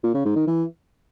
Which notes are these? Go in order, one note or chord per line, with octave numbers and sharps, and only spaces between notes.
A#2
C#3
G#2
D#3
E3